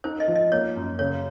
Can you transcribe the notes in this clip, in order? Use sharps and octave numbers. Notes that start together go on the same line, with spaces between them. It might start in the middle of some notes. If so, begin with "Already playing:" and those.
D#4 C5
D#5
F3
D#5
A#3 C#5
F#2
C#3 C#5